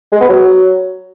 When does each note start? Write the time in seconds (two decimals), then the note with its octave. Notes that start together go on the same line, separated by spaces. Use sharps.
0.12 G#3
0.21 B3
0.29 F#3